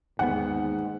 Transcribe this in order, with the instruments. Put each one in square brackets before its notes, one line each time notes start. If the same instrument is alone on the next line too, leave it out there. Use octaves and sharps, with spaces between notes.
[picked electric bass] G1 D#2 B3 [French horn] G#2 [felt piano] F#5